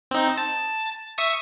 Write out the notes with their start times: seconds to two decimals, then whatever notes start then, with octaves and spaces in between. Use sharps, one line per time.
0.11 C4 D#4
0.38 A5
1.18 E5 C#6 D#6